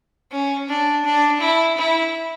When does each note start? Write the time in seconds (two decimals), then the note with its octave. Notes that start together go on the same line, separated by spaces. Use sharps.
0.31 C#4
0.69 D4
1.05 D4
1.40 E4
1.77 E4